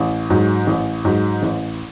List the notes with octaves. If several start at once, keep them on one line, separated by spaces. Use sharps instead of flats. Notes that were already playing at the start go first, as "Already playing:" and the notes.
Already playing: A1
G#2 F#3
A1
G#2 F#3
A1